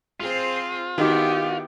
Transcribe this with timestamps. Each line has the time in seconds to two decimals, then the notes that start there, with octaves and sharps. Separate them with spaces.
0.20 C4 F4 G#4 C5
0.98 D#3 B3 D#4 E4 F#4 G4